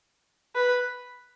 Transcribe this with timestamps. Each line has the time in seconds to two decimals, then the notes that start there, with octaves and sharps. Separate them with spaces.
0.56 B4